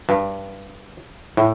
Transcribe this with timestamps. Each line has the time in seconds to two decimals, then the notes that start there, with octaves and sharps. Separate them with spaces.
0.09 G2
1.37 A2